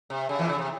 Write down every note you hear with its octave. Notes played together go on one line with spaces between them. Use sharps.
C3
C#3
E2 E3
C#3
C3